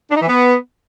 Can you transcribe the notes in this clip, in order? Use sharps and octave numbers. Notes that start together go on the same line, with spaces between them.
D4
D#4
E3
B3